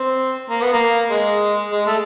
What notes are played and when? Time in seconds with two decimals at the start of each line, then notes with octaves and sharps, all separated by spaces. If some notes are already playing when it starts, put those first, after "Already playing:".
Already playing: C4
0.50 A#3
0.62 B3
0.73 A#3
1.10 G#3
1.72 G#3
1.87 A3